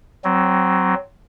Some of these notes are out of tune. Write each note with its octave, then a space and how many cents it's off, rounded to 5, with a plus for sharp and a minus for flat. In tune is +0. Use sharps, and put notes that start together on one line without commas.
F#3 +20 C4 +0